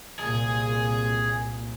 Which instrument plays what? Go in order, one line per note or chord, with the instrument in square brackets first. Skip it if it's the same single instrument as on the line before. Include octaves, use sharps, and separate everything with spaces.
[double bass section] C2 A#2 [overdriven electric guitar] G#4